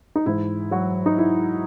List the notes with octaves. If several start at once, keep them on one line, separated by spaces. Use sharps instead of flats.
D#4
G#2 E3 E4
F#3 F#4
D#4
E4